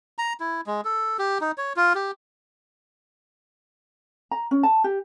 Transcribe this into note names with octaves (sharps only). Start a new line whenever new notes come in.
A#5
E4
G#3
A4
G4
D#4
C#5
F4
G4
A#5
C#4
A5
G4